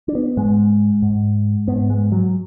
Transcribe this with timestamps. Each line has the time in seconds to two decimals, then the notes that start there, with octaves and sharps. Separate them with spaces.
0.08 D4
0.15 B3
0.37 G#2 G#3
1.02 G#2
1.68 G#2 B3
1.90 G#3
2.12 F#3